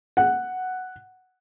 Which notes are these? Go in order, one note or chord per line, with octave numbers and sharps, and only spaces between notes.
F#5